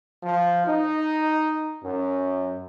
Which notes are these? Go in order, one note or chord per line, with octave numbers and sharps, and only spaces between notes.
F3
D#4
F#2